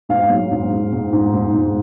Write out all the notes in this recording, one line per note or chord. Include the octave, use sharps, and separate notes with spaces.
G#2 F5
F#3
G#2
G#2
G#2
G#2
G#2
G#2